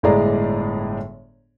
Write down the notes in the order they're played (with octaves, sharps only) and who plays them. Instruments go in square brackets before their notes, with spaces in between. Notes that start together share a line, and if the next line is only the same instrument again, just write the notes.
[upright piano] G1 A2 G#3 G#4 D5 A#5